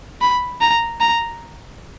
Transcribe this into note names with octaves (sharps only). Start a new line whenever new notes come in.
B5
A#5
A#5